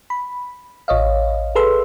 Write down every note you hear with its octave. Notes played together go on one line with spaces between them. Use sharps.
B5
A1 C#5 D#5 F5
G#4 A4 B4 C6 E6